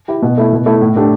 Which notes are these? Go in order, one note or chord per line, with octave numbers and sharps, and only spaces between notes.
E4 G4
B2
A3 E4
B2
A3 E4
A2
A3 D4 G4